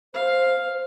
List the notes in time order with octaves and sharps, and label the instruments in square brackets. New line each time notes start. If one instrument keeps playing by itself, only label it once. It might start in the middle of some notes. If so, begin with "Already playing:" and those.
[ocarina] C5 [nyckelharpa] F5